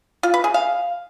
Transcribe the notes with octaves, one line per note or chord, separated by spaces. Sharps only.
F4
B4
G#4
F5